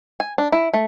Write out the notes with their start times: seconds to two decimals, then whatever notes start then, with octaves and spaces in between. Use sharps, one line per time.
0.20 G#5
0.38 D4
0.52 E4
0.74 A3